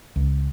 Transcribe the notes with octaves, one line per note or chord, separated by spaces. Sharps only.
C#2